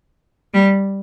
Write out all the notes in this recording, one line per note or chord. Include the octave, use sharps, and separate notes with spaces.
G3